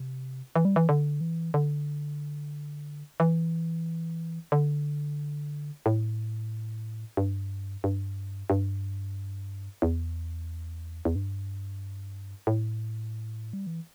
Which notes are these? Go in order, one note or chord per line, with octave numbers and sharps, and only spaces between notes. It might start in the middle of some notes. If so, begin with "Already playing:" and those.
Already playing: C3
E3
G3
E3
D3
E3
D3
E3
D3
A2
G2
G2
G2
E2
E2
G2
A2
G3
E3